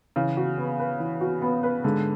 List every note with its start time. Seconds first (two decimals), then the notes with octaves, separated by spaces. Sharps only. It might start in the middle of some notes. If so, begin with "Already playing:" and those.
0.16 C#3 E3
0.37 F#4
0.58 B3
0.79 B4
1.00 E3
1.21 F#4
1.42 B3
1.63 B4
1.84 G#2 D3